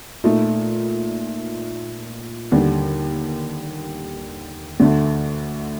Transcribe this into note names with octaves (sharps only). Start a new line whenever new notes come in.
A#2 A3 D#4
D#2 D3 G3
D2 D3 A3